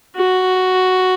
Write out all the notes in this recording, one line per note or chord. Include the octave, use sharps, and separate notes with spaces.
F#4